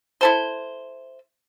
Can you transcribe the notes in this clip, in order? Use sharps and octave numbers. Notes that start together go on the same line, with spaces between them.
E4 A4 C5